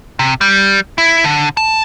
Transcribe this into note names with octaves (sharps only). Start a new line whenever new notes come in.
C3
G3
E4
D3
A5